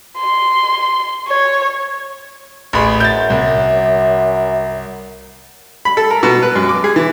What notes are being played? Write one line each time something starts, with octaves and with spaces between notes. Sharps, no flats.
C6
C#5
A1 G#4 B5
F#2 G6 A6
C2
B5
A4
A#4
B2
B4
F#2
D6
G#4
E3